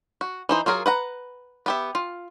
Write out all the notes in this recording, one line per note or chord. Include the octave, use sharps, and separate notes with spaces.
F#4
E3 D#4 C5
F#3 F4 G#4 A#4
B4 F#5 A#5
B3 G4 E5
F4